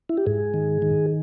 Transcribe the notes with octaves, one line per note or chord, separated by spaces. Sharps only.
E4
G4
G#2 G#4
D#3
D#3